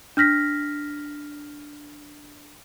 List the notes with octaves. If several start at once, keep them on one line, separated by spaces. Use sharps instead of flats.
D4 F6 A#6 B6